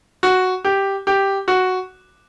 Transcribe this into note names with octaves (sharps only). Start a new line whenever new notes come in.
F#4
G4
G4
F#4